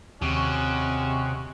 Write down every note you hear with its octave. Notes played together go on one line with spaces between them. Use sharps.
D#2 C3 G#3 C#4 F#4